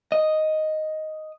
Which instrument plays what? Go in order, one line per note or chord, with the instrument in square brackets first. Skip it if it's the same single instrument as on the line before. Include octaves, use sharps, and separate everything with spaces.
[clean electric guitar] D#5